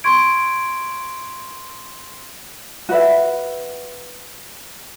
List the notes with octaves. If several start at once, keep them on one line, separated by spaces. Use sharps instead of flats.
C6 C#6 G#6 D7
F#4 B4 E5